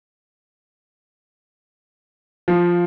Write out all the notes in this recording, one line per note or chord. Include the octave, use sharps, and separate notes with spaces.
F3